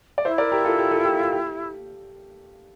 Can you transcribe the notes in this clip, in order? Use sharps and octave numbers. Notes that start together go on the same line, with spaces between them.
D5
E4 C5 E5
A#4 D5
G4 A#4
F4 A4
G4
F4 A4
G4
F4
G4